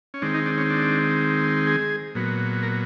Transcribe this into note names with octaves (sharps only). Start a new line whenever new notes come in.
C#4
D#3 G#3 C4 D4
D#4
D4
C#4
D4
G#4
A#2 F#3 B3
A#4